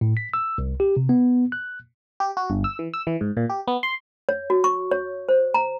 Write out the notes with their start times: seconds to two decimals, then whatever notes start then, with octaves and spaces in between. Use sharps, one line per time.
0.01 A2
0.17 B6
0.34 E6
0.58 C2
0.80 G4
0.97 C3
1.09 B3
1.52 F#6
2.20 G4
2.37 F#4
2.50 G1
2.64 E6
2.79 E3
2.94 E6
3.07 E3
3.21 G#2
3.37 A#2
3.50 G4
3.67 B3
3.83 C6
4.29 C#5
4.50 F#4
4.64 C#6
4.91 C#5
5.29 C5
5.54 A#5